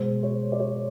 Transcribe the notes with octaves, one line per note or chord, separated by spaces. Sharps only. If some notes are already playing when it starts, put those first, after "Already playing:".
Already playing: B2 G#3 C5
C#5
D5
C#5